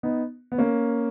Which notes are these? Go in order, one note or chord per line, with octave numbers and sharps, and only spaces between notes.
B3 D#4
B3
A#3 C#4